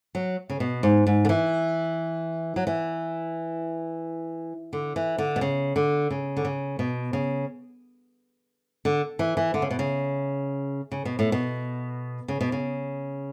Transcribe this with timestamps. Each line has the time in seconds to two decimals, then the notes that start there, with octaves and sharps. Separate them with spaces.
0.15 F#3
0.50 C#3
0.60 B2
0.83 G#2
1.07 G#2
1.25 D3
1.29 E3
2.56 F#3
2.67 E3
4.73 D3
4.96 E3
5.18 D3
5.36 B2
5.41 C#3
5.76 D3
6.10 C#3
6.37 D3
6.45 C#3
6.79 B2
7.13 C#3
8.85 D3
9.19 E3
9.37 E3
9.54 D3
9.62 C#3
9.70 B2
9.79 C#3
10.92 C#3
11.05 B2
11.19 A2
11.32 B2
12.28 C#3
12.41 B2
12.52 C#3